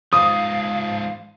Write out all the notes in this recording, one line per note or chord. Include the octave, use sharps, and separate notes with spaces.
G#2 F3 F5 D#6